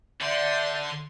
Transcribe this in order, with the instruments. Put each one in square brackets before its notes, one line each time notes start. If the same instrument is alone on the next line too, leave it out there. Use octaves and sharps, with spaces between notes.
[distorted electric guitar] D3 [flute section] D5 E5 G6 [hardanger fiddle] C6